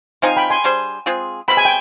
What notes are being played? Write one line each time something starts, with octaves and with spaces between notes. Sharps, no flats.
F3 C4 D#4 F5 G#5
G5 B5
G#5 C6
G3 D4 G#4 C5
G#3 C4 F4 G#4
B2 G#3 C4 B5
G#5
G5